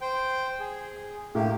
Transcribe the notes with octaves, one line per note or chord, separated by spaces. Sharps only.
C5 G5
G#4
A2 A#3 G4